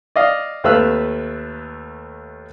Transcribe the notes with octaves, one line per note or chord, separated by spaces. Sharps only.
D5 D#5 F5
D#2 A3 B4 F5 E6 F#6